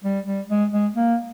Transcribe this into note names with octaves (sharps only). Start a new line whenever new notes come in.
G3
G3
G#3
G#3
A#3